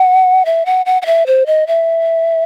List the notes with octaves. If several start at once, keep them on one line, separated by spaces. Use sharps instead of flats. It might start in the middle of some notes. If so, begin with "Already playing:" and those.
Already playing: F#5
E5
F#5
F#5
F#5
E5
C5
D#5
E5